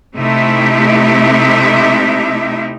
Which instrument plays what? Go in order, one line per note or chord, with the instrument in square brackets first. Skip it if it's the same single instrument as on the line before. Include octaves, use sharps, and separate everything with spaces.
[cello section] C3 A3 D#4 E4 G4 E5